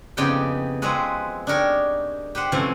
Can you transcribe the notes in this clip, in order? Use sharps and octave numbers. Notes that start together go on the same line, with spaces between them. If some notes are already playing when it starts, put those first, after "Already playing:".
F2 C#3 B3 D#4 G4 G5
F3 G#3 C4 F#4 G#4 B4
D4 D#4 G4 A#4 C#5
G4 B4 C5 F#5
C3 E3 F3 A3 C#4